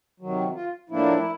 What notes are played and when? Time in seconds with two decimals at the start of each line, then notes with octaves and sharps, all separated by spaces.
0.20 C3 D#3 F#3
0.55 F4
0.89 A2 F3 A#3 D4 E4